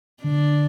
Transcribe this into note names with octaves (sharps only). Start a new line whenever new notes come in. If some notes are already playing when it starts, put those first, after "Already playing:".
D3 D4